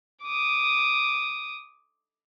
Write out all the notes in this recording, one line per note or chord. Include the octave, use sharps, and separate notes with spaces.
D6 D#6